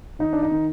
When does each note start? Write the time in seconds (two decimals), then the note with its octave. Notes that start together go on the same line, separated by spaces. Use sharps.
0.19 D#3 D#4
0.33 D4
0.43 D#4
0.51 D#3